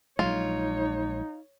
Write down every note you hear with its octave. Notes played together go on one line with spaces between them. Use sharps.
A#1 F#3 G#3 D#4 F4 C#5